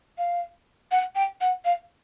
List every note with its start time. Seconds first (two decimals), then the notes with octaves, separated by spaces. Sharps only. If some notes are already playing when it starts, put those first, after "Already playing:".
0.18 F5
0.91 F#5
1.16 G5
1.41 F#5
1.65 F5